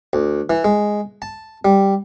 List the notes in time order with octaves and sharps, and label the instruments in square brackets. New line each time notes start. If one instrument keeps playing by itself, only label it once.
[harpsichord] D2
E3
G#3
A5
G3